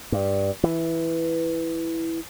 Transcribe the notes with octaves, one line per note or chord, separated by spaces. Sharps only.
G2
E3